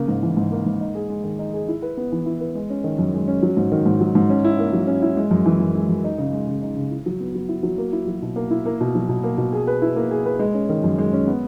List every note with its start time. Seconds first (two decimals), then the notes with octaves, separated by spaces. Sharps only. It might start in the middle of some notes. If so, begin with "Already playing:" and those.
Already playing: C#3 A#3
0.08 G#2
0.23 E3
0.37 G#2
0.51 A#3
0.66 G#2
0.81 D#4
0.95 G#4
1.10 G#3
1.24 D#3
1.39 D#4
1.54 G#4
1.68 E4
1.82 B4
1.97 B3
2.12 E3
2.26 E4
2.40 B4
2.55 G#3
2.70 C#4
2.84 D#3
2.99 F#2
3.13 G#3
3.28 C#4
3.43 F#3
3.57 G#2
3.72 D#3
3.86 G#2
4.01 F#3
4.15 G#2
4.30 C#4
4.45 E4
4.59 A#3
4.73 F#3
4.87 C#4
5.02 E4
5.17 G#3
5.31 F#2
5.46 E3
5.60 F#2
5.75 G#3
5.89 F#2
6.04 D#4
6.18 C#3
6.33 G#3
6.47 C#3
6.62 D#4
6.76 C#3
6.91 E4
7.06 F#3
7.20 B3
7.35 F#3
7.49 E4
7.63 F#3
7.78 A#3
7.93 E4
8.07 F#3
8.22 B2
8.36 A#3
8.51 E4
8.65 A#3
8.81 B2
8.95 F#3
9.09 B2
9.24 A#3
9.38 B2
9.53 G#4
9.67 B4
9.82 E4
9.96 A#3
10.11 G#4
10.26 B4
10.39 G#3
10.54 C#4
10.69 D#3
10.84 F#2
10.98 G#3
11.13 C#4
11.27 B3